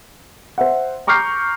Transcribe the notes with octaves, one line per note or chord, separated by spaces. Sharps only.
C5 E5 F#5
A#5 C#6 D6 F6 G6 C7